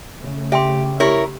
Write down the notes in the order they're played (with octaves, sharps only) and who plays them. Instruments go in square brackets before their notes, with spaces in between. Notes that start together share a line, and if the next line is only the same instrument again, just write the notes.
[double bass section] C#3 A3
[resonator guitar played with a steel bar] G4 [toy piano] E5 G5 C6
[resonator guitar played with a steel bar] E4 A#4 C#5 [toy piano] G4